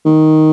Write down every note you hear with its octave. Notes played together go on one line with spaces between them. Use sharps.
D#3